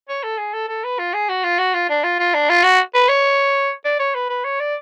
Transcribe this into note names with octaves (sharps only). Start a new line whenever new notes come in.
C#5
A4
G#4
A4
A4
B4
F4
G#4
F#4
F4
F#4
F4
D4
F4
F4
D4
F4
F#4
B4
C#5
D5
C#5
B4
B4
C#5
D5